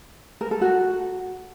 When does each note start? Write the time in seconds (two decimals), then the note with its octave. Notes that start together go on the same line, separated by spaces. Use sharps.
0.41 A#4
0.51 A4
0.61 F#4